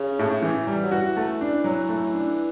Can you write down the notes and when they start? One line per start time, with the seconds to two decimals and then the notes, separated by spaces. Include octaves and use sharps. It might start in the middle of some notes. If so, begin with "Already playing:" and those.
Already playing: C#3
0.19 A2
0.43 E3
0.67 G3
0.83 F#3
0.91 E3 F#4
1.17 A3
1.41 D4
1.64 F#3
1.89 A3
2.14 D4